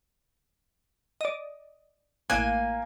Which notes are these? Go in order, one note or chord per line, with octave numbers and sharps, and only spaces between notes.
D5 D#5
A1 A#3 G#5 F#6